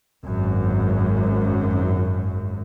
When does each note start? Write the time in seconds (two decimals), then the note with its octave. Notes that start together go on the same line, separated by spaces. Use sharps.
0.24 G#1 F#2